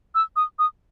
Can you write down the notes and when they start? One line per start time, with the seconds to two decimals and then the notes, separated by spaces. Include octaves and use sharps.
0.15 E6
0.36 D#6
0.59 D#6